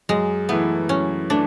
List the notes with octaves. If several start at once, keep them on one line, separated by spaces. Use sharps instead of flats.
F#2 G#3
E3 A3 B3 E4
F#2 C#4
E3 A3 D4